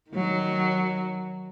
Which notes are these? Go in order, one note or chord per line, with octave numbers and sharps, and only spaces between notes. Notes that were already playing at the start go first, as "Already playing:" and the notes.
D#3 F#3